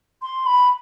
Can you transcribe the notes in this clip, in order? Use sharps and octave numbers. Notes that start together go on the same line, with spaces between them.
C6
B5